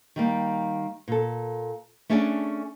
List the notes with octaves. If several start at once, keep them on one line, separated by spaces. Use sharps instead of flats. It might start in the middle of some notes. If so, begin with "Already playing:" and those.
D#3 G3 A#3
A#2 A4
A3 C#4 D4 G#4 D5